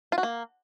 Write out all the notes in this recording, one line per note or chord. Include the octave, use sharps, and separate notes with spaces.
F4
F#4
A#3